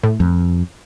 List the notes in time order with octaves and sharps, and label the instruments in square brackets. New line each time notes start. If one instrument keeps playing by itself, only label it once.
[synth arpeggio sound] A2
[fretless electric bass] F2